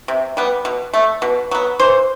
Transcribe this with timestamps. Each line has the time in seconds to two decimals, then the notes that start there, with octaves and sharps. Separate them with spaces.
0.08 C3
0.37 G3 B3
0.65 B2
0.93 A3
1.22 B2
1.51 F#3 B3
1.79 E3 C5